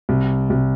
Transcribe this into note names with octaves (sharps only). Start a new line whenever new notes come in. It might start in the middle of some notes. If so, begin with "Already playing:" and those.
C2
C2